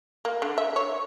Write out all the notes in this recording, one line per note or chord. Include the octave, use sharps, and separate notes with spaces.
A#3
D3
E5
C#5